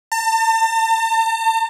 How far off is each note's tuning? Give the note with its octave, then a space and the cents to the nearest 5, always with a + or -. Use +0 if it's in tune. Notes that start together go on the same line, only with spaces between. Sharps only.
A5 +40